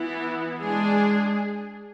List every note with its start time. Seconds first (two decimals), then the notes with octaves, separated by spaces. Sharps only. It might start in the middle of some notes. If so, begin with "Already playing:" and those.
Already playing: E3 B3 E4
0.61 G#3 D4 G#4